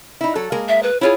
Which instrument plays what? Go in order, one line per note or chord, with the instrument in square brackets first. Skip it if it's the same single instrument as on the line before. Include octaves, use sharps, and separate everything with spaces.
[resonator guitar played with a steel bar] D#4 E4
F#3 A4
G#3 A#3 A#4
[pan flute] E5
B4
[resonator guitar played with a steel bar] E4 F4 G#4 [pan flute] C#5